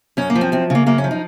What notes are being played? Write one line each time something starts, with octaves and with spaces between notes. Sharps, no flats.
F#2 C#4
A#3
F3
C4
F#2 C4
C#3 A#3
F#2 A#3
C#4
F3
D#4